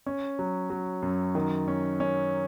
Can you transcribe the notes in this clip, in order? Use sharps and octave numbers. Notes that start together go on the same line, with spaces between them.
C#4
F#3
F#3
F#2
D#3
C#4
C#4